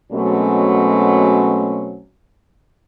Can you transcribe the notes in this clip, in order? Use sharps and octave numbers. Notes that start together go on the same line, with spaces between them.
B2 F#3 G#3 A3 C4 C#4